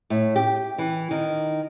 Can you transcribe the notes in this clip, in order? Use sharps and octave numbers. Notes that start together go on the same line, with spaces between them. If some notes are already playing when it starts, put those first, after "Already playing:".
A2
G4
E3
D#3